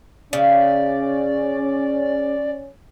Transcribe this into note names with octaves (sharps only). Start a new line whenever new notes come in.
C#3 C#4 D5